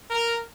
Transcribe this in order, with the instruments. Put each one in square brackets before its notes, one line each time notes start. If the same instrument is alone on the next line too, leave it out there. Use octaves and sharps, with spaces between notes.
[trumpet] A#4